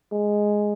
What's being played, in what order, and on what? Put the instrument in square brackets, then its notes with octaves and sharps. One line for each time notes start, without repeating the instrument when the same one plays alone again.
[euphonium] G#3